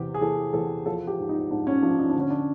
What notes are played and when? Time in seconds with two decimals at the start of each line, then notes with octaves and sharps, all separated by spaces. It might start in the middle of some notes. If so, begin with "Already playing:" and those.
Already playing: E2 C3 G4
0.14 G#4
0.21 E3 A4
0.53 E2 A4
0.86 F3 A4
1.07 G4
1.18 G#2
1.29 D#4
1.51 G#2 D4
1.67 C#4
1.82 F3 D4
1.99 D#4
2.10 D4
2.15 D3 C#4
2.30 D4